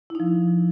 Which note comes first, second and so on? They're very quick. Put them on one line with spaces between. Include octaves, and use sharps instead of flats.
E4 D#4 F3